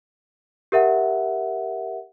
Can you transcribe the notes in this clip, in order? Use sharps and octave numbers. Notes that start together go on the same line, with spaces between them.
G4 A#4 E5 F#5